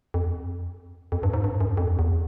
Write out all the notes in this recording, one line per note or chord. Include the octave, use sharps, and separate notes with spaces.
F2
F2
G2
G#2
G2
F#2
F2
E2